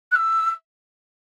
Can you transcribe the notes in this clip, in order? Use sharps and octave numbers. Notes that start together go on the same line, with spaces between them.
F#6
E6